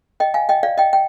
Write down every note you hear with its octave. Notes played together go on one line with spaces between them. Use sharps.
D#5 G5
F5 G#5
D#5 G5
D5 F5
D#5 G5
G5